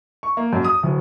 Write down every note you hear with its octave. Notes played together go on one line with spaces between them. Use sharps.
C#6
A#3
F#2
D#6
D1